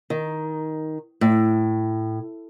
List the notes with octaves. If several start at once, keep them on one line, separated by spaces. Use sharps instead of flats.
D#3
A2